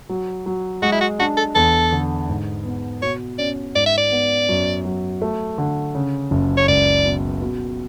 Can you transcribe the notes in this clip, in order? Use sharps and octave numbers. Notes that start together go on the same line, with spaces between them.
F#3
F#3
G#3 F#4
E4
F#4
D4 F#4
A4
E2 A4
D3
G#2
B3
B2 C#5
C#4 D5
G#2 D5
E5
D5
B3
F#2
F#3
A3
D3
C#3
F#1
C#5
C#2 D5
B2
B2